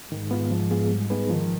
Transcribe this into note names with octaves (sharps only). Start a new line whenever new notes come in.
G#2 D#3
B3 F4
F3
B3 F4 G#4
G3
B3 D#4 G#4 B4
D#3 F3